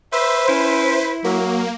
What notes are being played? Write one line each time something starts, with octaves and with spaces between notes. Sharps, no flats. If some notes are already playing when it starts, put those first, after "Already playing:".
B4 C5 E5
C#4 E4
F#3 A#3